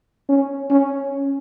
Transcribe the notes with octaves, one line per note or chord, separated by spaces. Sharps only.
C#4
C#4